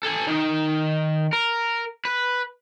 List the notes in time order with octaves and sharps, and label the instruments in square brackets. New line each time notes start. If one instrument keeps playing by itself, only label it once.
[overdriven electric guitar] A4 G#5
D#3 D#4
A#4
B4